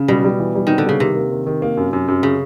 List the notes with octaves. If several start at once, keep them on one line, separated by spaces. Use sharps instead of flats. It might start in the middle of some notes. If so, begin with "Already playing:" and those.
Already playing: C#3
B2 G3
G3
E3
G3
D#3 C4
D3
C#3 G3
C3 D#3
A#3
D#3
D#3
A#3
F#2
F#2
F#2
C#3